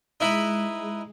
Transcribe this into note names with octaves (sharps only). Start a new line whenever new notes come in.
G#3 D#4 E4 B4